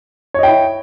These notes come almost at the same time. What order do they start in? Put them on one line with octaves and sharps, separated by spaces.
C#5 D#5 G5 E4